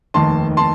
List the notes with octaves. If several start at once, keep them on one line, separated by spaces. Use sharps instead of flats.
F1 D#2 D#3 A5 C6
A5 C6